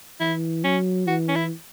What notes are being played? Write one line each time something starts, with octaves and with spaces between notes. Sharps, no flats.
E3 E4
F#3 C#4
E3 F#4
C#4
E4